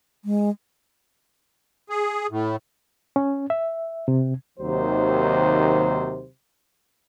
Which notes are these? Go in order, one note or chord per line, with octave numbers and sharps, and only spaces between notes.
G#3
G#4
A2
C#4
E5
C3
D#2 C3 D#3 F#3 C5